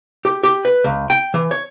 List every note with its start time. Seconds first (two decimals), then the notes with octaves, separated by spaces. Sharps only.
0.25 G4
0.43 G4
0.65 B4
0.84 C#2
1.10 G5
1.34 E3
1.51 C#5